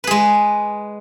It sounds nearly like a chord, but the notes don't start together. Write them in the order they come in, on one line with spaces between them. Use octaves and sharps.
B4 G#4 G#3